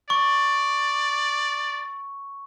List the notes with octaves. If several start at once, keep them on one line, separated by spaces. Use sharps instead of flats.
D5 C#6